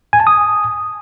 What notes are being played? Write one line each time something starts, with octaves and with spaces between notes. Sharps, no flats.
G#5
A5
D#6